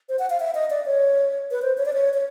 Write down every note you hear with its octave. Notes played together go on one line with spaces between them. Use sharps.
C5
F#5
F5
E5
D#5
D5
C#5
B4
C5
C#5
D5
C#5
C#5